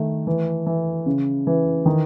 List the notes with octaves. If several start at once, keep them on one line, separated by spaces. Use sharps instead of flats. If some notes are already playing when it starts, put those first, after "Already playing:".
Already playing: D#3 A3
E3
E3
C#3
E3
D#3